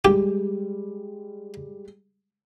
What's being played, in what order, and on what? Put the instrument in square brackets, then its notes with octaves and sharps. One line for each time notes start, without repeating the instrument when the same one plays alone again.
[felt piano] G3 G#3 [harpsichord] G4